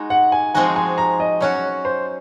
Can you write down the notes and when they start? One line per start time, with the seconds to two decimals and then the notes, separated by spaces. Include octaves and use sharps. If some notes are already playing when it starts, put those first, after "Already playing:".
Already playing: G#3 D#4 F#4
0.10 F#5
0.32 G#5
0.54 F3 G#3 C4 D#4 F#4 G#5
0.76 G#5
0.98 A#5
1.20 D#5
1.41 F#3 C#4 F#4 C#5
1.85 C5